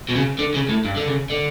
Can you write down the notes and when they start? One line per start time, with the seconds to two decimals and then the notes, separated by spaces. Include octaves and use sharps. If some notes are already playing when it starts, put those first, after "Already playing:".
0.09 B2
0.15 C#3
0.39 D3
0.54 C#3
0.69 A2
0.85 G2
0.96 D3
1.08 C#3
1.30 D3